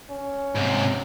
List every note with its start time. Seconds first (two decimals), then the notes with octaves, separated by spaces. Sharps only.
0.10 C#4
0.56 G#2 C3